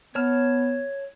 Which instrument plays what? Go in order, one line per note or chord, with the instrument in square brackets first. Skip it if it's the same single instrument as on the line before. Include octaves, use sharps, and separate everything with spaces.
[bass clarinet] B3 [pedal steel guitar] C#5 A5 F6